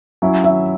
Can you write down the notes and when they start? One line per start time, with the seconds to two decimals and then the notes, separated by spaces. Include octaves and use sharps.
0.22 F#3 C#4 E4
0.44 E5